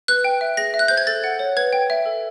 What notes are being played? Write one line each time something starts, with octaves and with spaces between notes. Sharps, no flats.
B4 F#6
G5
E5
G#4 A#6
E5
F#6
C5 G6
G#6
A4 A6
F#5
C#5
B4 G#6
G5
E5
A4